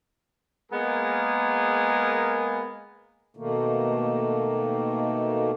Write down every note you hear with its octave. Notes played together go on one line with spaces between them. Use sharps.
G#3 A#3 B3 G#4 A#4
B2 D#3 A3 A#3